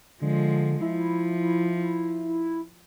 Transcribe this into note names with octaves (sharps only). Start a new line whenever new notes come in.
D3 F3 G#3
F3 E4